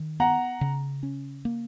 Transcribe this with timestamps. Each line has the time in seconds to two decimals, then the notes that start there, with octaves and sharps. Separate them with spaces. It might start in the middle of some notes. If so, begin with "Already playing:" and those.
Already playing: D#3
0.20 B3 F#5 A#5
0.61 C#3
1.03 C#4
1.45 A#3